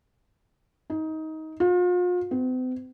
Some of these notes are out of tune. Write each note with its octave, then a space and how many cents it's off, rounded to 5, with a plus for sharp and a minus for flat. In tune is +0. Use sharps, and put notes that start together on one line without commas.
D#4 +20
F4 +40
C4 -45